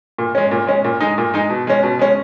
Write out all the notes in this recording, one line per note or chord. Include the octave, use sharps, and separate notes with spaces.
A#2
G#3 C#4
A#2
G#3 C#4
A#2
G#3 D#4
A#2
G#3 D#4
B2
G#3 C#4
B2
G#3 C#4